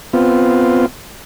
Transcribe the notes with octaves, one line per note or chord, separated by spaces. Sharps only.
B3 C4 F4